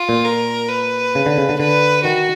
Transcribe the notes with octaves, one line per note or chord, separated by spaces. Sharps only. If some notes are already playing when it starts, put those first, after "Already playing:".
Already playing: F4
A#2
A#4
B4
C#3
D3
C#3
D3
D3 B4
D#3 F#4